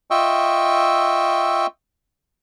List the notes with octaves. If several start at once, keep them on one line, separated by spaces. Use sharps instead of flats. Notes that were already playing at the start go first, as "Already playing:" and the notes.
F4 D#5 E5 G5 C#6 E6